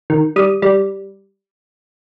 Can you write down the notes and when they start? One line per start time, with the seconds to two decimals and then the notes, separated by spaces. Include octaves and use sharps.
0.10 D#3
0.36 G3 D#6
0.62 G3